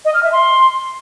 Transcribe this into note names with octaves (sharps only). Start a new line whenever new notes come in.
D#5
F6
E5
C6